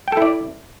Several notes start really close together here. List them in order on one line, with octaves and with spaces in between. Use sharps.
G5 A4 E4 D5